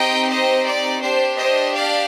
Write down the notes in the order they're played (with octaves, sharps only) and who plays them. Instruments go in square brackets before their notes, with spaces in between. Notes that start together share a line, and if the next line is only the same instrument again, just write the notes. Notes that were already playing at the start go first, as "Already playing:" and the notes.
Already playing: [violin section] C4 D#4 G4 D#5 G5
C5 D#5
D5
D4 G4 C5
C5 D#5
D5 F5